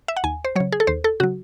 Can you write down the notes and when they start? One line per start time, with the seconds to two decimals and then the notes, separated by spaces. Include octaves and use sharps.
0.08 E5
0.16 F#5
0.24 D#2 G#5
0.45 C5
0.56 C#3 F#3 C#5
0.72 G#4
0.80 A4
0.87 D#2 C5
1.04 A4
1.20 C#3 F#3 F#4